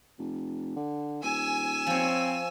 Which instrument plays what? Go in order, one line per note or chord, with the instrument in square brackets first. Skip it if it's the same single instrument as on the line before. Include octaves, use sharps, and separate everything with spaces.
[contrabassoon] F1
D3
[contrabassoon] D#1 [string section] G#5 E6
[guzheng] F3 C#5 [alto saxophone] C4